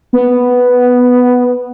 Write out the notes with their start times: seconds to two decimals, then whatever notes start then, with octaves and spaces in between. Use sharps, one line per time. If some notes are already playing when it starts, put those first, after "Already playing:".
0.13 B3